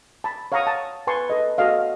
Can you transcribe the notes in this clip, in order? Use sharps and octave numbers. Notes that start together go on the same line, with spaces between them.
A5 B5
C#5 F5 F#5 A#5 C#6 D#6
A5
B4 G#5 A5 C6 C#6
A4 B4 D#5
F#4 A4 D#5 F5